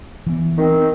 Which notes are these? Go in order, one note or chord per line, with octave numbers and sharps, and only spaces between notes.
E3 B3
D#3 C4